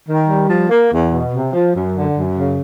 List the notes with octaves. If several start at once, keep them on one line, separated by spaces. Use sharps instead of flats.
D#3
G3
F3
A#3
E2
B2
C3
F3
F#2
D3
F#2
C#3